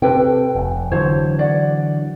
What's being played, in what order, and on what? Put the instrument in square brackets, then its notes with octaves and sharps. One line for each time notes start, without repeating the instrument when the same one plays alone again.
[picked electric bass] C3 [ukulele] A4 B4 G5
[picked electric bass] F1
[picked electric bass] D3 E3 F#3 [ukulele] C5 C#5
[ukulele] D5 F#5